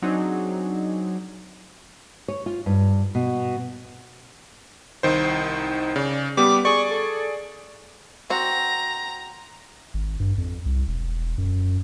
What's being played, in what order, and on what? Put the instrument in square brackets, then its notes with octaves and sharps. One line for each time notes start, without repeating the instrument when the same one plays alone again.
[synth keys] F#3 C4 D4 D#4 G#4
[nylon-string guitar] C#5
F4
G2
B2
[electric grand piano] C2 D#3 C5
[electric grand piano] C#3 [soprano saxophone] D5
[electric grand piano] G3 B3 G4 [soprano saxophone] D6
[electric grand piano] G#4 D5 [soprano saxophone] C#6
[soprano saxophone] A4
[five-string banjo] C4 F#4 [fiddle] A#5
[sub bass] G#1
G2
F2
C2
E1
F#2